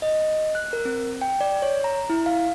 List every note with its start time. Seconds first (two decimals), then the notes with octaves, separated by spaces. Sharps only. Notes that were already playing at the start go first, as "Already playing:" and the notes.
0.02 D#5
0.55 F#6
0.73 A#4
0.85 C4
1.21 G5
1.41 D5
1.62 C#5
1.84 A#5
2.10 E4
2.26 F5